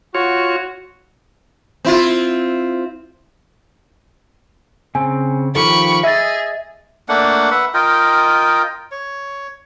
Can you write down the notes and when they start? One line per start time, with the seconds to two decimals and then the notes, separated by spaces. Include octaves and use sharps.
0.15 F4 F#4 C#5
1.85 C4 E4 F4
4.95 C#3 C4 G#5
5.56 D#3 F3 G4 A4 B5 C#6
6.03 G#4 D#5 E5 G#5 E6 A6
7.09 A3 A#3 D4 F#5
7.51 B4 E5 F#5
7.74 F4 A#4 D#5 G5
8.92 C#5